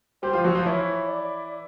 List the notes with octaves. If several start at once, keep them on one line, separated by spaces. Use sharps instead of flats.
G3 G4 C5
F3 F4
F#3 F#4
F3 F4
E3 E4 C#5
D5